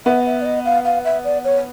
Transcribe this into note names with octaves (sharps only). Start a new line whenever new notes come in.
B3 E5
E5
D5
D#5
F5
F5
E5
D5
C#5